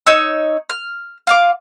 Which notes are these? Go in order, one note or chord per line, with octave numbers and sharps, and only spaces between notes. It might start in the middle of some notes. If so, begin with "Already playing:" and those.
D#4 C#5 E6
F6
F4 F5 D6